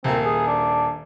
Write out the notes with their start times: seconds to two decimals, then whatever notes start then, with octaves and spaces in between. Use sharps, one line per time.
0.04 D#1 A#3 C4
0.25 G#4
0.47 D4